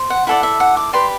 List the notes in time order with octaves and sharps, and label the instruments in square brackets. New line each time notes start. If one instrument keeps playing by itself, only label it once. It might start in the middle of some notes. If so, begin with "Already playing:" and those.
Already playing: [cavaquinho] C5
F#5
E4 A4 D5 F#5
E5
F#5
D6
G4 B4 D5 C6